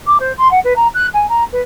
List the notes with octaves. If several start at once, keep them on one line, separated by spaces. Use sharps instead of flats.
D6
C5
C6
F#5
B4
A#5
F#6
G#5
A#5
B4